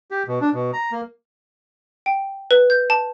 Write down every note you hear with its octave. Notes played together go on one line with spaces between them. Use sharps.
G4
B2
D4
B2
A#5
A#3
G5
B4
G6
A5